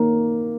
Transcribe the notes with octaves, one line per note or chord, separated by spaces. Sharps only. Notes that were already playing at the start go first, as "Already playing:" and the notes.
Already playing: D#3 A#3